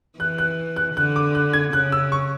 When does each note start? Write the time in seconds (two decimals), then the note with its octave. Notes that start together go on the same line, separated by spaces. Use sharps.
0.19 E3 F#6
0.38 F#6
0.76 F#6
0.96 D3 F#6
1.16 D6
1.35 F#6
1.53 G#6
1.73 C#3 F#6
1.92 E6
2.12 C#6